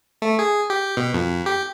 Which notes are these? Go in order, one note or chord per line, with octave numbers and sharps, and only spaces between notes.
A3
G#4
G4
B2
F2
G4